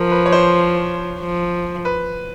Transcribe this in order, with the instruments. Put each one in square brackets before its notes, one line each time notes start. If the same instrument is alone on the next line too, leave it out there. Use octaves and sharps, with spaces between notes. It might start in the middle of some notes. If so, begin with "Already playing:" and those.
Already playing: [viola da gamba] F3 [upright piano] A#4
[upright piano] B4
C#5
C5
[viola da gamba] F3
[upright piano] B4